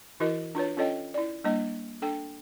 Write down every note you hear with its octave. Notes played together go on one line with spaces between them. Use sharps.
E3 E4 F#4 A#4 D#5
D4 F4 B4 C#5
C#4 F4 A4 C#5 D#5 G5
E4 D5
G3 A#3 D4 D#5
D4 A4 G5